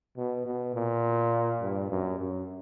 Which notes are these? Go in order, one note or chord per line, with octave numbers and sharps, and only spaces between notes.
B2
B2
A#2
G2
F#2
F#2